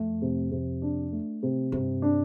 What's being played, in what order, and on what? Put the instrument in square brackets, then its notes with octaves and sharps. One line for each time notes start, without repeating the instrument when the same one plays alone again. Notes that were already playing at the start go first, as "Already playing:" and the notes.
Already playing: [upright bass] F2 [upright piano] A3
[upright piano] C3
C3
D4
A3
C3
[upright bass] G2 [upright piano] C3
[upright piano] D4